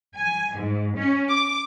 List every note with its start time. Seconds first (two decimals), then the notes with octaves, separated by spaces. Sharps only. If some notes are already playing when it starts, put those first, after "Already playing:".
0.17 G#5
0.58 G#2
0.97 C#4
1.30 D6